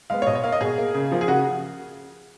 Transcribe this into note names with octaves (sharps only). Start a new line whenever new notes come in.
G#3 B3 F5
C#5
B2 D#5
C#5
A#3 F5
D#5
B2 G#4
A#3
C#3
F3 A#3
G#4
C#3 F#4